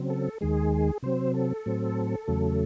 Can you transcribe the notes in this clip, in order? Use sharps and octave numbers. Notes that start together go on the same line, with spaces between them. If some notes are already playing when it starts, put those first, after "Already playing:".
Already playing: C#3 F#3 C4
A4
D#2 D#3 G#3 G#4
C3 F#3 C4 C5
A4
A2 F#3 C4
E2 C#3 F#3 A3